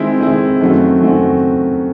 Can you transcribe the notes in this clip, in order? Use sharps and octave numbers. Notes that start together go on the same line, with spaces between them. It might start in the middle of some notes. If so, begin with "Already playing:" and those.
Already playing: D#3 G#3 C4 E4
D#3 G#3 C4 E4
F#2 D#3 A3 C4 F#4
F#2 D#3 A3 C4 F#4